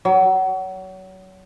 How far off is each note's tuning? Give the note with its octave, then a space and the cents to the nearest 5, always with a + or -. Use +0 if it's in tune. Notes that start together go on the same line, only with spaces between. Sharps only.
F#3 +30